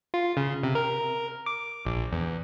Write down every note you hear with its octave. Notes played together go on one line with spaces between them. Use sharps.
F4
C#3
C3
A#4
D6
A#1
E2